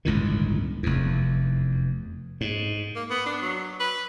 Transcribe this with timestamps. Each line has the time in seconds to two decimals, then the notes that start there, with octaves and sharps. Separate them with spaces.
0.05 G1 C#2 A2 D#3
0.83 F1 E2
2.41 G#2
2.96 A#3
3.10 B3
3.26 D4
3.42 F#3
3.80 B4